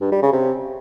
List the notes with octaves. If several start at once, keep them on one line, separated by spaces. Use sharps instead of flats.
G2
G3
C#3
C3